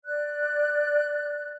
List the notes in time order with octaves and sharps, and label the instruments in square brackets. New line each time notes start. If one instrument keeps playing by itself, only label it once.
[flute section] D5 F#6